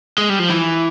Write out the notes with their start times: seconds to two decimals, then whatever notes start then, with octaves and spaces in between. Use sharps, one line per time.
0.18 G#3
0.29 G3
0.39 F3
0.50 E3